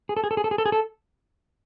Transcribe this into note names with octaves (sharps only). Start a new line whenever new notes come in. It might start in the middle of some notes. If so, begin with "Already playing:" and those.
G#4
A4
G#4
A4
G#4
A4
G#4
A4
G#4
A4